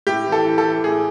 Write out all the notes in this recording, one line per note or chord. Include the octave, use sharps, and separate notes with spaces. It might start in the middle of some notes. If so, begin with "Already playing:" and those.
A2 G4
E3
A4
E3
A4
E3
A2 G#4